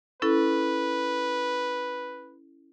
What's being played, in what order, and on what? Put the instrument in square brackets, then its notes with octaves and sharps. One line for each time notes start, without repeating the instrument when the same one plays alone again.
[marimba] C#4 E4 A4 [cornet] B4